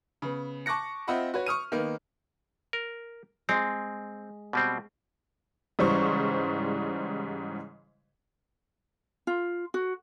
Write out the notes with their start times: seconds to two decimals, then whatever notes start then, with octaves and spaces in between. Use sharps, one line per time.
0.22 C#3 B3
0.66 A5 C#6 D6 F#6 A#6 C#7
1.08 C4 F4 D#5 E5 F#5 B5
1.34 F#4 B4 C#5
1.46 C#6 D#6 F6 D#7
1.72 D#3 A#3 B3
2.73 A#4
3.49 G#3 C4
4.53 B2 G3 C4
5.79 G#2 C#3 E3 G3 C5 C#6
9.27 F4
9.74 F#4